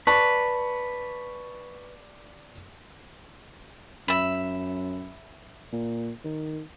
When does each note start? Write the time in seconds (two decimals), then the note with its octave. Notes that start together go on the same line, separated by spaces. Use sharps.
0.07 B4 D5 A5 C#6
4.08 F#2 E5 B5
5.72 A#2
6.24 D#3